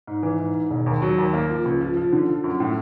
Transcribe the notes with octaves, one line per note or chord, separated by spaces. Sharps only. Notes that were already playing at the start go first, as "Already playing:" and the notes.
G#2
E3
G#2
G#2
E1
D#2
F#3
D#2
A#3
F3
C#2
F3
F3
D3
F3
F#2
A2